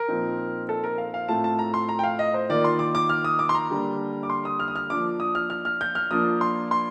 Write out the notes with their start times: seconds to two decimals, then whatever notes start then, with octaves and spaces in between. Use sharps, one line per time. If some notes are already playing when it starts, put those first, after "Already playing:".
Already playing: A#4
0.08 A#2 F3 C4 D#4
0.69 A4
0.84 A#4
0.98 F5
1.14 F5
1.28 A2 A3 C4 F4 A5
1.44 A5
1.59 A#5
1.74 C6
1.89 A#5
1.99 G5
2.03 F5
2.19 D#5
2.34 C5
2.49 D#3 A#3 F4 D5
2.64 C6
2.79 D6
2.95 D6
3.09 F6
3.24 D#6
3.39 D6
3.49 C6
3.55 A#5
3.70 D3 G3 A#3 D4
4.23 D6
4.30 C6
4.45 D#6
4.59 F6
4.68 D#6
4.75 F6
4.90 F3 A#3 D4 F4 D6
5.20 D#6
5.35 F6
5.50 F6
5.65 F6
5.81 G6
5.95 F6
6.10 F3 A#3 D4 F4 D#6
6.41 C6
6.71 C6